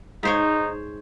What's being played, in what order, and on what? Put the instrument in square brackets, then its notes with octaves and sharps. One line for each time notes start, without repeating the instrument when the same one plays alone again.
[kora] G#2 C5 C#5 [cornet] D#4